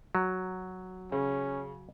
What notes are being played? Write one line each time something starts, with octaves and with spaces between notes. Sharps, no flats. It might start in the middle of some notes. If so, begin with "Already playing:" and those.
F#3
C#3 C#4